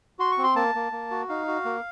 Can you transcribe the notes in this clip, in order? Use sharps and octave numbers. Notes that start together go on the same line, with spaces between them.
F#4 C6
C#6
C4
C6
A#3 A5
A#3
A#3
F#4
D#4 F5
F#4
A#3